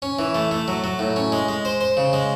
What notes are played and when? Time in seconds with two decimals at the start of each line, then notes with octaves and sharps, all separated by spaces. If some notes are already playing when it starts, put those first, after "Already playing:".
0.02 C#4
0.19 E3
0.34 A3
0.51 A3
0.68 F#3
0.84 F#3
0.99 A2
1.16 C#4
1.32 G#3
1.48 G#3
1.65 C5
1.81 C5
1.97 C#3
2.13 G#3